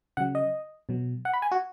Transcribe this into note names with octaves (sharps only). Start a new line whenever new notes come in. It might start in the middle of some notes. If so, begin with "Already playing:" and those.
C#3 F#3 F#5
D#5
B2 F#3
F#5
B5
G#5
F#4